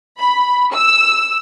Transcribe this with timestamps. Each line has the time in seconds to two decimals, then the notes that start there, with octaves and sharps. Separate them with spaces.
0.19 B5
0.74 E6